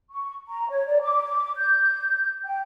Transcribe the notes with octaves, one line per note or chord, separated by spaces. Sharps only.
C#6
A#5
C#5
D5
D6
G6
G5